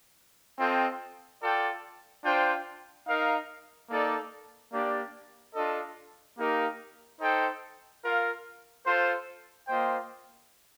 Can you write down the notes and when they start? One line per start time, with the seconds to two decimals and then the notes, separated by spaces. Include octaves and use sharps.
0.58 C4 F4 A4 D#5 G5
1.41 F4 A4 D5 G5
2.24 D4 F4 C5 G5
3.07 D#4 A#4 F5
3.90 A#3 D#4 A4 D5
4.72 A#3 D4 G4 D5
5.54 D4 F4 A4 D#5
6.38 A#3 D#4 G4 A#4 F5
7.20 D#4 A4 C5 G5
8.03 F4 A#4 F5
8.86 F4 A4 C5
9.68 A#3 F4 C5 D#5 G5